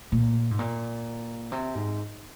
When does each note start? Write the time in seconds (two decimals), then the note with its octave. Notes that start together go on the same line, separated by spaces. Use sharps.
0.12 A#2
0.51 G#2
0.59 A#2
1.52 C3
1.75 G#2